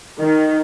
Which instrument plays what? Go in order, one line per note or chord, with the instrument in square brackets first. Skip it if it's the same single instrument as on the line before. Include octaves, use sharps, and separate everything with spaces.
[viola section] D#3